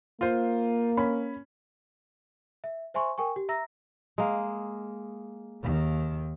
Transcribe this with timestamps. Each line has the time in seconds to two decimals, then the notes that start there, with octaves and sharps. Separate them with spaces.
0.21 A#3 F4 C5
0.97 C#4 B5
2.64 E5
2.94 C5 E5 G#5 C6 C#6
3.18 A#4 G5 G#5 C#6
3.36 G4
3.49 E5 A#5 E6 A#6
4.18 G#3 A#3
5.62 D#2 D#3